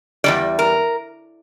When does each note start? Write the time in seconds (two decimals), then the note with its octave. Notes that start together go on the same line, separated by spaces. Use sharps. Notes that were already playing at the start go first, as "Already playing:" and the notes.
0.24 E2 E3 G3 D5
0.59 A#4